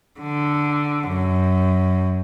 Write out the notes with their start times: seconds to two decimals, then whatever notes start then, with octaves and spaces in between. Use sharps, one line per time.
0.20 D3
1.09 F#2